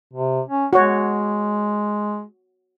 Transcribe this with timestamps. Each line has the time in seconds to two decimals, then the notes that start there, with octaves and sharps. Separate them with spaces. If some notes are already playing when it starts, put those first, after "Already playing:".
0.13 C3
0.49 C#4
0.73 G#3 F#4 C#5